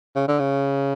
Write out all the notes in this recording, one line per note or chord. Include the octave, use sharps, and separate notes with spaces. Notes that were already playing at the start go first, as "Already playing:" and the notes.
C#3
D3
C#3